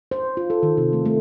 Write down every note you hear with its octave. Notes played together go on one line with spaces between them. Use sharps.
C5
F4
A4
D#3
C3
A3
A3